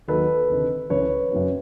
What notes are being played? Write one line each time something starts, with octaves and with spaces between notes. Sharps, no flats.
D#2 D#3 F#3 A4 B4
D2 C3 D#3
C#2 C#3 E3 B4 C#5
F#2 C#3 F#3